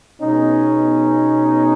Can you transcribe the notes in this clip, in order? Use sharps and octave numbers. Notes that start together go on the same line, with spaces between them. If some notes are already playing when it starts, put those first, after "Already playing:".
B2 G#3 B3 C#4 D#4